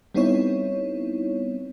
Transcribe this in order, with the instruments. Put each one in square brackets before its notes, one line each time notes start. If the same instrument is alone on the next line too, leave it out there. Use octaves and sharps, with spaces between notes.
[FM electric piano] G3 B3 C4 D#4 E4 C#5